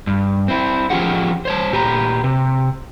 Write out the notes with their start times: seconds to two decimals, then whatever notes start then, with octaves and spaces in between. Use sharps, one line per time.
0.07 G2
0.48 C4 E4
0.90 F3 C#4 F4 G4 G#4 F#5
1.45 C5 C#5 A5
1.72 A#2 G4 B4 A#5
2.24 C3